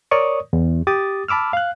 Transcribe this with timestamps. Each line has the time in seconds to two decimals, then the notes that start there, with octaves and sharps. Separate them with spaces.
0.11 A#4 C#5 D5 C#6 D#6
0.53 E2
0.87 G4 D6 D#6 A6
1.28 A5 B5 D6 E6 F6
1.53 F5 F#6